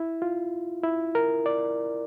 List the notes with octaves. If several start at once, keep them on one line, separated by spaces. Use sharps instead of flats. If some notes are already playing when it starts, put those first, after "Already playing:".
Already playing: E4
F4
E4
A#4
D5